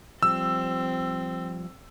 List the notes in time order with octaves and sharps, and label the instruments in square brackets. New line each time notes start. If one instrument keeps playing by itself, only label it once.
[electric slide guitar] F3 G3 [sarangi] C4 [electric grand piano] E6